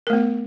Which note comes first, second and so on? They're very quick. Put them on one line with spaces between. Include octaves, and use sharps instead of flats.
A#4 A3 B3